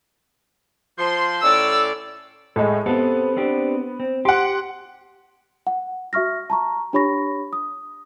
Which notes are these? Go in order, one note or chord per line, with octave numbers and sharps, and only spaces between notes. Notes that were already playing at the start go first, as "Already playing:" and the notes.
F3 C6
A2 C#4 D5 E6
A2 G#3 A4
B3 C4 G4 A4
C4 D4 G4
C4
G4 F#5 C6
F#5
F#4 E5 C#6 F6 A#6
A5 A#5 C#6
D4 G4 C#5 B5 C#6 A#6
D#6